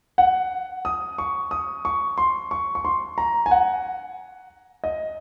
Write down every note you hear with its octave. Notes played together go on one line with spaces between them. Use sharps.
F#5
D#6
C#6
D#6
C#6
C6
C#6
C#6
C6
A#5
G#5
F#5
D#5